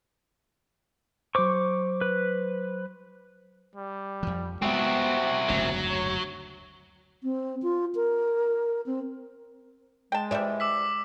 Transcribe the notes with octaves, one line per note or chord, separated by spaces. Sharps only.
F#3 C5 C#6 D6
B4
G3
F2 F3
G#3 B3 C4 E4 F#4
F#1 D2 G#2 F#3
C#5
C4
F4
A#4
C4
G#3 G5 A5
E3 G3 D5 E5
D6 E6 B6